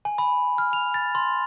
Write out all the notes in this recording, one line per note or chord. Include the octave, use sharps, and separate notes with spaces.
G#5
B5
F6
F7
A6
C6